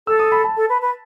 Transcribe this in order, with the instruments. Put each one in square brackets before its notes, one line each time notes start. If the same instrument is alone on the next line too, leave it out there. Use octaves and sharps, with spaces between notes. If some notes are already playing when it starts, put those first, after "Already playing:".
[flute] A4 [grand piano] E6
[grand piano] D#6
B5
A5
[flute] A4
B4
B4